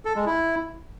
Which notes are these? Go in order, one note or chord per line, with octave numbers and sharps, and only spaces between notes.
A4
G#3
E4